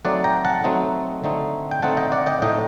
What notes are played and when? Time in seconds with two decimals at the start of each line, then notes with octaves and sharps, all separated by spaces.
0.05 F#3 A3 C4 D#4 D5 F#5
0.24 G5 A#5
0.45 F#5 A5
0.64 F#3 A3 C4 D#4
1.24 D3 A3 C4 D#4
1.71 G5
1.82 D3 A3 C4 D#4 F#5 A5
1.97 D#5 G5
2.12 D5 F#5
2.26 D#5 G5
2.42 A2 A3 D#4 D#5 G5